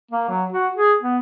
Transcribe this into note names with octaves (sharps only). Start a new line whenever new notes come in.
A#3
F#3
F#4
G#4
B3